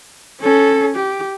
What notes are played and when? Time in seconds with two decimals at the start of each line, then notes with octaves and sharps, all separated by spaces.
0.40 C#4 A4
0.95 G4